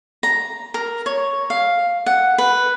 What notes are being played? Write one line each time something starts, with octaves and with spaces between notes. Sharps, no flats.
A#5
A#4
C#5
F5
F#5
B4